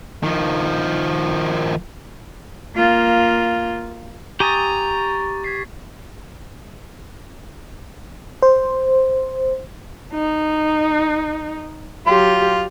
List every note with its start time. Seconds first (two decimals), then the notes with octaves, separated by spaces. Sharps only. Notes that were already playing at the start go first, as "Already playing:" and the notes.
0.23 D#3 F3
2.76 A#3 F4
4.40 G4 G#5 A#5 C#6 D#6 A6
5.44 G#6 B6 C7
8.42 C5
10.14 D#4
12.07 F#3 F4 G4 C6